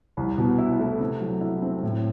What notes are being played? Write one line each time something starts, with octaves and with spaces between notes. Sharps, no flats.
C2
B2
E4
A3
C3
F#3
E4
C4
A2